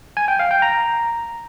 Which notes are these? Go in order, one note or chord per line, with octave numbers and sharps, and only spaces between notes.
G#5
G5
F5
G5
A#5